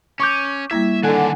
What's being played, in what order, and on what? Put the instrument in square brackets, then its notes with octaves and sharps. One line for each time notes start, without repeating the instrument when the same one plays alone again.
[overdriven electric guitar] C#4 [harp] C#6 D6 G6
[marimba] G3 A#3 E4 [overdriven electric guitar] E5 [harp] G#6
[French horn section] D3 [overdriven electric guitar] D#3 D4 [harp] F#5 G#5